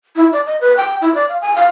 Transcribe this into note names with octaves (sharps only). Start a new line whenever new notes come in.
E4
D5
D#5
B4
G5
E4
D5
F5
G#5
F5